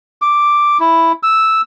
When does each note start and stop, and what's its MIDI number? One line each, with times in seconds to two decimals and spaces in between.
0.22 0.78 86
0.80 1.12 64
1.23 1.61 88